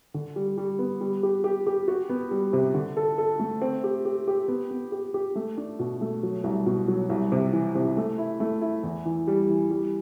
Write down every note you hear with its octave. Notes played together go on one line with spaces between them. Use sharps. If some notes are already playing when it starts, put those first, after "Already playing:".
D3
G3
G3
B3
G3
G4
G4
G4
F#4
B3
G3
C3
D3
A4
A4
A3
C4
G4
G4
G4
B3
B3
G4
G4
A3
D4
B2
A3
F#3
C2
B2
F#3
C2
C3
E3
C3
A3
E4
A3
E4
E2
E3
G3
E3
G3